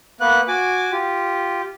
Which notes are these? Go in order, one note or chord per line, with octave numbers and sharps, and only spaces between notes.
A#3 B3 B4 F#6
F#4 G#5 D6
F4 G4